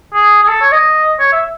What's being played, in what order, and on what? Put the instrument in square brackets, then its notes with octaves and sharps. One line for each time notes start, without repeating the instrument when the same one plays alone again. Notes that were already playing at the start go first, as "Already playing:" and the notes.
[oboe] G#4
G#4
A4
C#5
D#5
C#5
E5